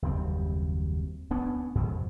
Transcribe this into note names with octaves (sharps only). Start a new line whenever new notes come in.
F#1 D#2 G3 C4
D2 B3 C#4 D4
F2 G#2 B2